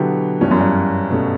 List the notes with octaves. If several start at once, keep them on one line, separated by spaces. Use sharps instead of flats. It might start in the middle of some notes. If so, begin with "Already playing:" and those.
Already playing: B2 D3 F#3 B3 E4 G4
G2 E3 G3 C#4 E4
F#2
G2
B2 A3 C#4